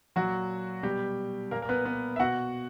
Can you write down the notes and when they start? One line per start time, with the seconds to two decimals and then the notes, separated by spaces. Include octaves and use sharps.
0.16 A#2 F#3 F#4
0.83 B2 G3 G4
1.51 A#2 A#3 A#4
1.62 A#4
1.69 B3 B4
1.85 B3 B4
2.16 E5
2.20 B2 F#4 F#5